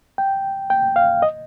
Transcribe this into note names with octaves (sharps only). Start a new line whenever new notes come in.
G5
G5
F5
D#5